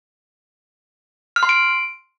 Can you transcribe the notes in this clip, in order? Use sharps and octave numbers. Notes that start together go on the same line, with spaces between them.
F6
C6
D7